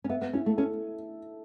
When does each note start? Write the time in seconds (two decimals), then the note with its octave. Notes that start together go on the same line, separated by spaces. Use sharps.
0.04 C#4
0.09 B3 E5
0.22 B3
0.33 C#4 E4
0.46 A3
0.57 C#4 A4